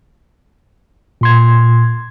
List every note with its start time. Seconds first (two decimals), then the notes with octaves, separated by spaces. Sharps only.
1.21 A#2 C6 G#6